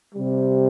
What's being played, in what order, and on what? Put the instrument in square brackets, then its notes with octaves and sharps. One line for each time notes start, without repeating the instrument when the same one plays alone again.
[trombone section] C3 G3